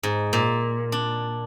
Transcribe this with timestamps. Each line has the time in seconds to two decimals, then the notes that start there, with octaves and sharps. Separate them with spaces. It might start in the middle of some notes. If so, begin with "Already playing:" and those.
0.03 G#2
0.33 A#2
0.92 D4